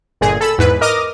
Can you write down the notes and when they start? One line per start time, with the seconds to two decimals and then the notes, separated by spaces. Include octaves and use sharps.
0.21 G1 A#2 G#4
0.41 A4 B5 E6
0.58 E2 G#2 B4
0.81 A#4 D#5 D6 D#6 F6 A#6